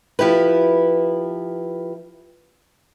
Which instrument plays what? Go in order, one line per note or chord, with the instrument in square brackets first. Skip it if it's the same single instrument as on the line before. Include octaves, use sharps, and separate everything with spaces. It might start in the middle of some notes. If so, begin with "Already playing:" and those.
[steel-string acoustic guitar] F3 E4 G4 B4